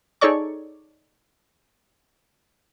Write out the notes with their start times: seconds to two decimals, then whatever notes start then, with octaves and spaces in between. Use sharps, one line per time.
0.21 D#4 G#4 A4 C#5 D5 C#6